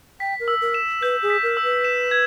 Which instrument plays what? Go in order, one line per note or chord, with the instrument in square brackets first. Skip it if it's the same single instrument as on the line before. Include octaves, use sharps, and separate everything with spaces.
[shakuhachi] G5 [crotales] B6
[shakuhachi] A#4
[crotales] E6
[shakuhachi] A#4
[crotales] E7
[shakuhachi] B4 [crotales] G6
[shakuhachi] G#4
[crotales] B6
[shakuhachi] A#4
[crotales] E6
[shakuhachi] B4
[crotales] E7
G#6